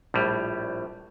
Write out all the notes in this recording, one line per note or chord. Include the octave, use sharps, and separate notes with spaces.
A#1 A2 G3